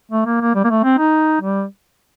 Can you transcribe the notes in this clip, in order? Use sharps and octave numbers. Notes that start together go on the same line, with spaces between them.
A3
A#3
A#3
G3
A#3
A3
C4
D#4
G3